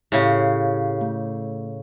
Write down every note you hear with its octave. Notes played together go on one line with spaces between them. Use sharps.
A2 C#3 G4 F5
A3